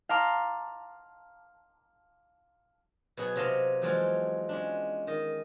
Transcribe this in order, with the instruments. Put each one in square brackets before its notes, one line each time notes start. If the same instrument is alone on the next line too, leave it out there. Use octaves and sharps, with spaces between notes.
[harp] F5 A5 A#5 C6 D6 F6
[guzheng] B2 F#3 G#4 F#5
C3 F#3 D#5 F5 A5 C6
E2 F3 F#3 G#3 F4 D5
G#3 C#4 D4
D#3 D#5